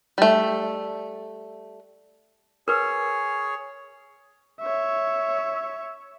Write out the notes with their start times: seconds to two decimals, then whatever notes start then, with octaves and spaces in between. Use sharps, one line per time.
0.18 G3 A3
2.68 G#4 A#4 B4 C#5
4.60 C#5 E5